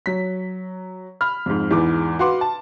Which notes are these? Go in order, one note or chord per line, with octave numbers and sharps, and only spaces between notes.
F#3 B6
B5 F6
F2 G#2
E2 G#2 E3 B4 D6
F#4 B4 F5 F#5 C6 D6
A5